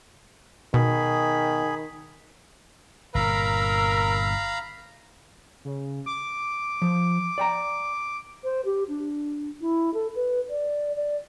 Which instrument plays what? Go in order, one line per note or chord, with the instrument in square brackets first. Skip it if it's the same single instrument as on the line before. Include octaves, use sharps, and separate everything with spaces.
[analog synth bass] B2 [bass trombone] D#3 [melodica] G#4 B5
[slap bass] G1 A#2 [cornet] A#4 [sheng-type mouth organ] F5 A#5 B5 [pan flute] E6
[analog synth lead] C#3
D6
[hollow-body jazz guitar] F3
D5 G5 A#5
[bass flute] C5
G4
D4
E4
A4
B4
D5
D5